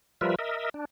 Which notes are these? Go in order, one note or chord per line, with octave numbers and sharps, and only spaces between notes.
F3 G3 F4 A#4 B4 E5
A#4 D#5 E5
D4